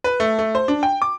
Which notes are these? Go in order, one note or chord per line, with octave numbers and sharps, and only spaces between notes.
B4
A3
A3
C5
D4
G5
D6